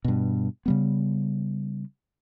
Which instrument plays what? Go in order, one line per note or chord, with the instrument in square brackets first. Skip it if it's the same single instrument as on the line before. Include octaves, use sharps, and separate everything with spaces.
[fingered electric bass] G2 B2
C#3 G3 B3